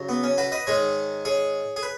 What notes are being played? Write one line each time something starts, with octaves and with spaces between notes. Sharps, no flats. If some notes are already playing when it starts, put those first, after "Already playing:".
Already playing: F#2 C#3 F#3
B3
C#4
F#4 B4
B4 D#5
G#2 D#3 G#3 G#4 C#5
G#4 C#5
G#4
B4